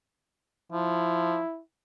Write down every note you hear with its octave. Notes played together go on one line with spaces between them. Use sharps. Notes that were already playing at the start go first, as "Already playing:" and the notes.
F3 E4